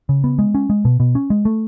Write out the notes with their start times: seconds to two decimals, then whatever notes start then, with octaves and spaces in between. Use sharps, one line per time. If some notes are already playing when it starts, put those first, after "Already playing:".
0.09 C#3
0.24 B3
0.39 G#3
0.55 C#4
0.70 G#3
0.85 B2
1.00 B2
1.15 C#4
1.30 G#3
1.45 A3